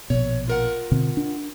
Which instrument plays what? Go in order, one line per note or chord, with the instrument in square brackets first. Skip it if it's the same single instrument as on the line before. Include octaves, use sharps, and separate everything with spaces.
[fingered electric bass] A#1 B2 [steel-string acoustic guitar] C#5
[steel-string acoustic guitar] F4 A#4 F#5
[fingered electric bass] B2 D3 C4
D4